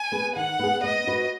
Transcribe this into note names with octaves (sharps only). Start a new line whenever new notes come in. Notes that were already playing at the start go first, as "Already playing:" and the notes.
Already playing: G#5
B3 G#4 B4
D#3 F#5
B3 G#4
B3 D#5
F#4 B4